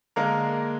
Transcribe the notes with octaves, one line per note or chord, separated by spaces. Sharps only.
D3 G#3 A#3 A#4